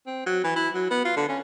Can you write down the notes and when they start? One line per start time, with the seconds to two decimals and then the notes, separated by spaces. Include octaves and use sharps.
0.07 C4
0.26 F#3
0.44 E3
0.56 E4
0.74 F#3
0.90 B3
1.05 F4
1.17 D3
1.29 C#4